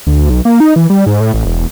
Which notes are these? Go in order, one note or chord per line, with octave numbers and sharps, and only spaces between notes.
D2
B1
A#3
D#4
E3
G3
G#2
A2
A1
E1